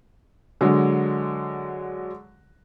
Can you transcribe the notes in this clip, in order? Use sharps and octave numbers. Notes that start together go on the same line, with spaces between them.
D3 F#3 G#3